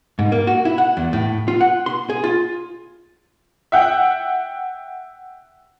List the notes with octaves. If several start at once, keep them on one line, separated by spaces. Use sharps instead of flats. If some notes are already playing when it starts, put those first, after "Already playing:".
G#2
A#3
F#4
E4
F#5
E2
A2
F4
F#5
C6
G#4
F4
E5 F#5 G5